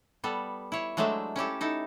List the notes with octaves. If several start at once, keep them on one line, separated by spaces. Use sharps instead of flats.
G3 B3 A4
E4 C#5
F#3 G#3 A3 D4 C5 E5
C#4 E4 G4 A4
D#4 E4 A4